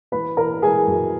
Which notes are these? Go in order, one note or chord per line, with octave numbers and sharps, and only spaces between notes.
E3 B4 B5
E3 A#4 A#5
E3 G#4 G#5
F#2